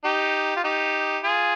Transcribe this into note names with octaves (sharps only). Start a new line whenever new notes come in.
D#4 G4
F4
D#4 G4
F4 G#4